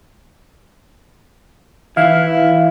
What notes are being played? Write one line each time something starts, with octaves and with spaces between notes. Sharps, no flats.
E3 E4 F5